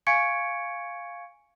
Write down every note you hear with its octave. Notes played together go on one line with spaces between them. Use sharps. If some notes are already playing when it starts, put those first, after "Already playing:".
F5 G#5 C#6 G#6 C#7 D7